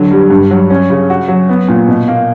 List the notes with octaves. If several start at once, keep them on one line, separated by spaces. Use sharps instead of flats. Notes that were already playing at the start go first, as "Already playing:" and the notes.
Already playing: D3 F#3
G3
G2
F#3
C#4
C#3
F#4
F#3
B3
A#2
B2
A#3